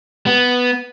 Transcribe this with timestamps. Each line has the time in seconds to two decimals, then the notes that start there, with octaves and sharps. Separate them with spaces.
0.27 B3